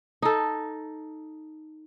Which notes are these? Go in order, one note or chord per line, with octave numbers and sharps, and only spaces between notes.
D#4 A4